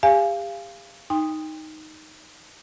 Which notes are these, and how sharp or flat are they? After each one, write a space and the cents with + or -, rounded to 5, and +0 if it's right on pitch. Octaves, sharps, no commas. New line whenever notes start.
G4 +40 F5 -20 G#5 +0
D#4 +0 G5 +35 C6 +0